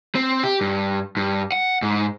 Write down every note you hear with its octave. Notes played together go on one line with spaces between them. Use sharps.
C4
G4
G2
G2
F#5
G#2